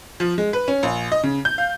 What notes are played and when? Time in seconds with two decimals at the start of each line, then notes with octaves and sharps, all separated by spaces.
0.20 F3
0.38 G#3
0.53 B4
0.68 C#4
0.83 A#1
1.12 D#5
1.23 C#3
1.45 G6
1.58 F5